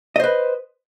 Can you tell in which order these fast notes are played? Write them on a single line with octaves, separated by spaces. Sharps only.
D#5 C5 B4